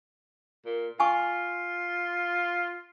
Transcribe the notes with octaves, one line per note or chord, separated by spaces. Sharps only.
A#2
F4 G#5 C#6